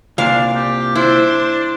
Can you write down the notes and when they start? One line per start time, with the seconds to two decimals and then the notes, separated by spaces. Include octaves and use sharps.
0.18 C2 A#2 D4 F5
0.56 G4
0.95 D4 E4 C5